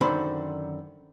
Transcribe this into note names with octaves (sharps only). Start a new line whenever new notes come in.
F#2 D3 D#3 C5 B5